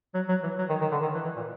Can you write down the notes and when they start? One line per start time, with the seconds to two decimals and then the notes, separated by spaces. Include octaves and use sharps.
0.14 F#3
0.29 F#3
0.43 E3
0.58 F#3
0.69 D#3
0.81 D#3
0.92 D3
1.02 D#3
1.15 E3
1.25 E3
1.36 A#2